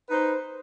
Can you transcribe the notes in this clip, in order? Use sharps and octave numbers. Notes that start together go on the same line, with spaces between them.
D#4 B4 C5